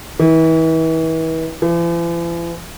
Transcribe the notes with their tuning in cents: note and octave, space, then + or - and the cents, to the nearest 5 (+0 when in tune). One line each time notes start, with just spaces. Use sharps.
E3 -35
E3 +45